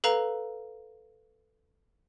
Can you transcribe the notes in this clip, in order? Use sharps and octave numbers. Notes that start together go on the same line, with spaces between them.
A4 B4 F5 A#5